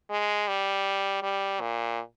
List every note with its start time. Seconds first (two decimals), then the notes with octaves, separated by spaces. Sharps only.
0.10 G#3
0.48 G3
1.22 G3
1.61 A#2